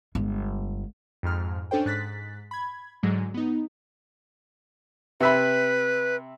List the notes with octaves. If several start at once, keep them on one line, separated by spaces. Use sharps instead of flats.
G1 G#3
F2 G#2 F6
C#4 D4 A4 C5 G5
G#2 F#6 A6 B6
B5 G#6
G#2 D3 F#3 G#3
B3 D#4
C3 B4 E5 B5